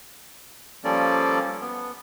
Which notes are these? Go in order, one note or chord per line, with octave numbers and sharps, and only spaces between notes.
F3 G3 A#3 C#4 A4 D5
B3